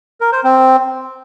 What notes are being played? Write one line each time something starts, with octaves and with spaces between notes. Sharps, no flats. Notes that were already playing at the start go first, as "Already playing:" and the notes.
A#4
C5
C4